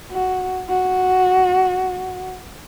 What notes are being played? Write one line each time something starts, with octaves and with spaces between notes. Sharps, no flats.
F#4
F#4